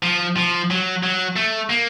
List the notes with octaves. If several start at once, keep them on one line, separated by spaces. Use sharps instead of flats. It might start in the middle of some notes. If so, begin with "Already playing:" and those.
F3
F3
F#3
F#3
A3
A#3